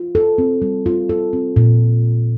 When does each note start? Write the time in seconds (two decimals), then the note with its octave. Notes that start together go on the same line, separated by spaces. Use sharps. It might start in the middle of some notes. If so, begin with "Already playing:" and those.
Already playing: F4
0.15 A4
0.38 C4
0.62 G3
0.86 F4
1.09 A4
1.33 C4
1.56 A#2